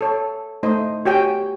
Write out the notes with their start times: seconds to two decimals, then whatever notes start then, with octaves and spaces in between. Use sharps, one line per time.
0.01 A4 C#5
0.63 A3 D#4 C5 D#5
1.05 F#4 G4 C#5 G5 G#5